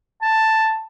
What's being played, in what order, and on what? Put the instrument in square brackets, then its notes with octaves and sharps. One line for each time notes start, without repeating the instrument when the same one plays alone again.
[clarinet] A5